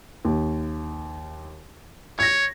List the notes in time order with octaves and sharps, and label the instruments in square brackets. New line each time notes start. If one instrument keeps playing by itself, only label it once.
[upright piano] D#2
[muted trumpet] C#5 [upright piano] G#6 A#6